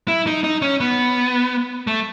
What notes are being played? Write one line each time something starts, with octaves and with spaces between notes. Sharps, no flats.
E4
D#4
D#4
C#4
B3
A3